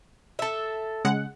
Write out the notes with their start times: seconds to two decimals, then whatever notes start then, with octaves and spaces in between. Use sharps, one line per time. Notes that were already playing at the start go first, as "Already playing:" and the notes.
0.39 A4 E5
1.05 C#3 G#3 F#5